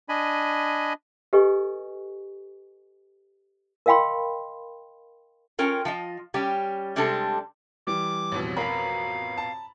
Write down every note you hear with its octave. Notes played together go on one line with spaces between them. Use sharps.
D4 D#5 G#5 B5
G4 A4 B4 D#5 G#5 C#6
A#4 D#5 F5 G5 B5 C6
C#4 F4 A#4 G5
F3 F4 D#5
G3 C#4 G4
C3 G3 G#3 C4 D4 A4
E3 G3 D6
A1 F2 B2
A#4 F5 A#5 B5
A5